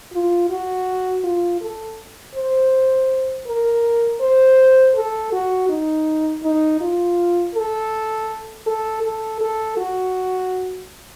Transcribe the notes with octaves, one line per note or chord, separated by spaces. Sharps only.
F4
F#4
F4
A4
C5
A#4
C5
A4
F#4
D#4
D#4
F4
A4
A4
A4
A4
F#4